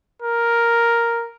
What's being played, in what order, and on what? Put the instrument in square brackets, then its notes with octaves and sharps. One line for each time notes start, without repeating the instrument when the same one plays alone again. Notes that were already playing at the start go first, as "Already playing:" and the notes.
[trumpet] A#4